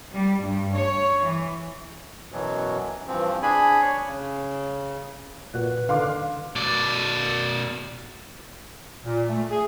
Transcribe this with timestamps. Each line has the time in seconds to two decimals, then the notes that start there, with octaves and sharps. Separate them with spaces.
0.15 G3
0.44 G2
0.77 C#5
1.25 E3
2.32 F#2 B2 E3 F#3
3.08 G2 E3 F3 C4
3.42 D4 G#4 G#5 B5
3.81 C#5
4.05 C#3
5.54 A#2 F#4 B4
5.89 D3 D#3 F5 C6 D6
6.56 B2 D5
9.04 A#2
9.29 A3
9.50 G#4